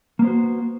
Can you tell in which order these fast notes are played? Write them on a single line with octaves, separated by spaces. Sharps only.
A#3 B3 C5 F#4